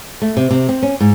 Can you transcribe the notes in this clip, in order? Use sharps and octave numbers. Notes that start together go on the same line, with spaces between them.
A3
C3
C3
C4
C#4
G#2